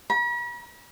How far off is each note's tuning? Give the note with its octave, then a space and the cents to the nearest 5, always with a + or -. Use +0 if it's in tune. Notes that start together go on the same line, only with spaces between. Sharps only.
B5 -45